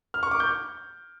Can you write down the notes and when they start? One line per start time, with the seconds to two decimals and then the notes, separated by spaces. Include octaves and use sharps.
0.14 F6
0.23 C#6
0.31 D6
0.40 G6